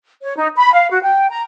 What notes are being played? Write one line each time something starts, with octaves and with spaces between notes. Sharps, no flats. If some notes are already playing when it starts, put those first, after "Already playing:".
C#5
D#4
B5
F5
F#4
G5
A#5